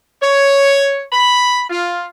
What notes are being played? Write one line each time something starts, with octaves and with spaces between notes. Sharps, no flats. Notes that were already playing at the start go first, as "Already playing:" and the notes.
C#5
B5
F4